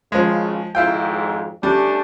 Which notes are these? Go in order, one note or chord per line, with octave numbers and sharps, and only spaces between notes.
G#1 C#3 F3 G#3
G#1 F2 G#2 E4 F4 G5
G3 A3 C#4 D4